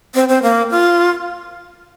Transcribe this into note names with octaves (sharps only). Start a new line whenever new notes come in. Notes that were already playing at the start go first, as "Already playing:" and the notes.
C4
C4
A#3
F4